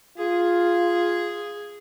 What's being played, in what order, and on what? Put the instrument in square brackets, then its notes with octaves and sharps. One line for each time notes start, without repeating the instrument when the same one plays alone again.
[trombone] F4 [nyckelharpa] G#4